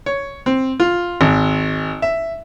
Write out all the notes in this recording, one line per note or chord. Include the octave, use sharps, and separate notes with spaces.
C#5
C4
F4
G#1
E5